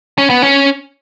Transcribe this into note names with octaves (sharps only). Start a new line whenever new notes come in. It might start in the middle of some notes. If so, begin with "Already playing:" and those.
C#4
B3
C#4